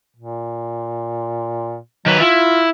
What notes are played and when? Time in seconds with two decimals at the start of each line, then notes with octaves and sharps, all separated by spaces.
0.16 A#2
2.06 D#3 F#3 B4
2.20 E4 F4